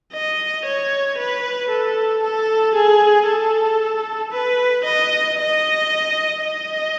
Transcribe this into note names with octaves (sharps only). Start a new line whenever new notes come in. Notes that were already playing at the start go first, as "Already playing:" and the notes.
D#5
C#5
B4
A4
A4
G#4
A4
B4
D#5
D#5
D#5